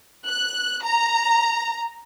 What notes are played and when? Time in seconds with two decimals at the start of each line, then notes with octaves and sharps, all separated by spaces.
0.25 F#6
0.82 A#5